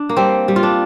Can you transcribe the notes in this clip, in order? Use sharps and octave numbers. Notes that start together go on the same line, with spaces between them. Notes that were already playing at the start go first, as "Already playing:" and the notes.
Already playing: D4
A#3
G3 C4
G3
F4
D4